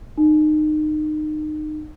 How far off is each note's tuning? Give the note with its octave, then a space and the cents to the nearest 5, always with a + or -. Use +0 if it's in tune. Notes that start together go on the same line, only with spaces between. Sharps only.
D#4 -30